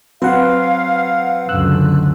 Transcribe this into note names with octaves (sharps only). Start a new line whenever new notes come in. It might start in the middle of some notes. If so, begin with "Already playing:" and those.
F#3 C4 B4 F5 F#5
C#2 F#2 D3 E6 F#6